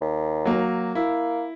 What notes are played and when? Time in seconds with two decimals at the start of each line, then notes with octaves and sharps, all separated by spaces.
0.01 D#2
0.45 F#3 A#3
0.95 A#3 E4